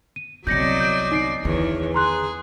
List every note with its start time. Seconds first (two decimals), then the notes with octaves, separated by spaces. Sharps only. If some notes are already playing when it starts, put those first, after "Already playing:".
0.16 D#7
0.47 C2 F#3 B3 D5 D#5 G6 A#6 C#7
0.80 G6 D7
1.11 D#4 C7 D7
1.45 E2 D#3 C#5
1.94 G#4 A#5 C6 F#6